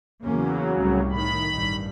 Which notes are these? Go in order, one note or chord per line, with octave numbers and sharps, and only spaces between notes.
E2 C#3 F#3 A#3 C#4
C2 A2 G3
A2 D#3 B5
A1 G2